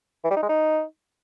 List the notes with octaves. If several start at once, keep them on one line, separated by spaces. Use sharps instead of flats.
E3
G3
D#4
G#3
D#4